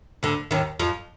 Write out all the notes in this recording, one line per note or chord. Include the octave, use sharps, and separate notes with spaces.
D2 D3
D#2 D#3
F2 F3